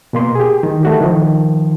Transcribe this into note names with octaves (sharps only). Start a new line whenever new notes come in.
B2 A#3 C6
G4 G#4
D#3
A3 F#4 G4
D#3 F3